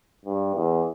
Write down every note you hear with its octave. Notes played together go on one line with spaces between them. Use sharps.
G2
E2